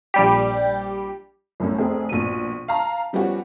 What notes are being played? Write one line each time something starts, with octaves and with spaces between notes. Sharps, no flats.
A#1 G3 G4
C2 F#2 A2 C#4
F1 C4 G#4
A#1 B2 D#7
F5 A5 A#5
F3 G3 B3 C#4 F#4